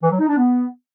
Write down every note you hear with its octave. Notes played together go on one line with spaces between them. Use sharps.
E3
F#3
D#4
D4
B3